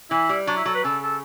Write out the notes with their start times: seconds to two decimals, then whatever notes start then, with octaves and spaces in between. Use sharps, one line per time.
0.10 E3 E4
0.29 G3
0.47 F#3 D4
0.56 E4
0.65 F#3 A4
0.75 B4
0.84 C#3 A4
1.03 A4